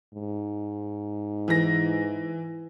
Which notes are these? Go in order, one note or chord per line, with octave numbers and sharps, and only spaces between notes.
G#2
E3 A#6